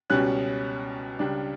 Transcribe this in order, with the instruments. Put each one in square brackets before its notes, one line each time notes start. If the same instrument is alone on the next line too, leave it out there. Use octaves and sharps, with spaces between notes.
[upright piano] C#2 B2 G3 C#4 F#6
C#2 C#3 G3 D4